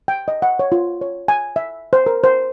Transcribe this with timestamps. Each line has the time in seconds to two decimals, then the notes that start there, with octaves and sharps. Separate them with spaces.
0.08 G5
0.28 D#5
0.42 F#5
0.59 C#5
0.72 F4
1.01 C#5
1.28 G#5
1.56 E5
1.93 C5
2.06 A#4
2.24 C5